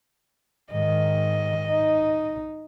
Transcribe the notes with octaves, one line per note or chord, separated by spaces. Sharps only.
G#2 D#3 D#5
D#4